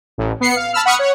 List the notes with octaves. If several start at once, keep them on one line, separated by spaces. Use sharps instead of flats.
A1
B3 C7 C#7
F5
A5 B5 E6 F6
F#5 B5 C#6 D#6 F6 C#7
C#5 F#5